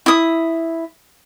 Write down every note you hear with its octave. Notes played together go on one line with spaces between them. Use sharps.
E4 D#6